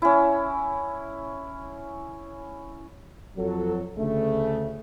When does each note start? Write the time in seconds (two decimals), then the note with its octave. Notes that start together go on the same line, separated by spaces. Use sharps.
0.02 C#4 E4
3.38 F2 F#3 A4
3.97 D2 C#3 A3